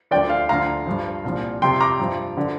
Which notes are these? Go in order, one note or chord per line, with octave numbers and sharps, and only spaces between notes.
D2 D3 F3 D5 G5
F5
D2 D3 F3 F5 A#5
G2 F3
C2 A#2 F3
F2 C3 F3 G5 C6
A#5 D6
G2 F3
D3 F3